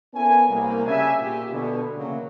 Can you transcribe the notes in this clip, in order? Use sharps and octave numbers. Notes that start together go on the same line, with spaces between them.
B3 C#4 E4 A4 A#4 G#5
C2 G3 A#3
C#3 D4 E5 G#5
A#2 G4
B2 D3
C#3 E3 F#3 A3 A#3